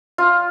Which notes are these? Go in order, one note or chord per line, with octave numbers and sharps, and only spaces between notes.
F4